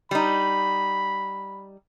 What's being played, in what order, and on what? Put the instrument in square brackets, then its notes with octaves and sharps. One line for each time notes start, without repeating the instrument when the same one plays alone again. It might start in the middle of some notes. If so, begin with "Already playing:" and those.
[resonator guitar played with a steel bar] G3 D#4 [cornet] B5